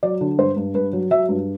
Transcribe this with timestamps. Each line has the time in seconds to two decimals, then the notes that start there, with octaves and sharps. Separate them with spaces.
0.03 F#3 D5
0.21 D3
0.38 G2 C5
0.56 G2
0.74 G2 B4
0.93 F#3
1.11 F#3 E5
1.29 G2